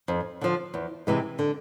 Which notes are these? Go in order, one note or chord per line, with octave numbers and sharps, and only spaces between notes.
F2
D3 F3
E2
C3 E3 G#3
D3